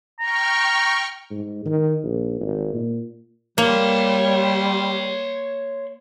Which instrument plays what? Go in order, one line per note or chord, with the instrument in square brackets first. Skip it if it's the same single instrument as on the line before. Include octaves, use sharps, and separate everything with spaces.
[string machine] G5 C#6 F6 [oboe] A#5
[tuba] G#2
D#3
A#1
G#1
A#2
[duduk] G3 [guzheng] A#3 [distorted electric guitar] C#5 C6